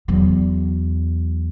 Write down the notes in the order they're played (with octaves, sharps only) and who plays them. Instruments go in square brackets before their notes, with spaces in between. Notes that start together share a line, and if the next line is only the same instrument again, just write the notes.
[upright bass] E2 F#3